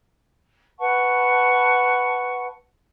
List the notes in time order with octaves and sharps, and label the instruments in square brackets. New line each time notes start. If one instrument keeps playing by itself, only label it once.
[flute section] B4 F#5 A5 C#6